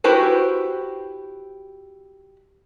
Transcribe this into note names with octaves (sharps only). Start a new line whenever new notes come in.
E4 F#4 G4 B4 C5